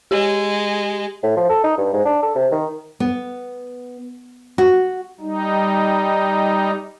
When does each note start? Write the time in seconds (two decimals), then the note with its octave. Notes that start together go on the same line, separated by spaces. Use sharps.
0.11 G#3 G4
1.23 A2
1.37 F3
1.50 A4
1.64 D#4
1.78 G2
1.94 G#2
2.05 D4
2.22 A4
2.35 C3
2.52 D#3
3.00 B3
4.58 F#4
5.21 G3 D#4